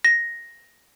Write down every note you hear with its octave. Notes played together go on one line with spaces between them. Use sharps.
A#6